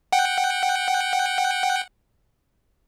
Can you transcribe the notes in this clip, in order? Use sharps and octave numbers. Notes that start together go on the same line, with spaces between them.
F#5 G5